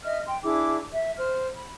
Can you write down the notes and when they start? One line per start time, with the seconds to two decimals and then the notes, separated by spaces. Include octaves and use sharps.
0.04 D#5 E5 F6
0.26 G5 C6
0.43 D4 E4 G#4 D6
0.91 E5
1.17 C5 F6
1.56 B5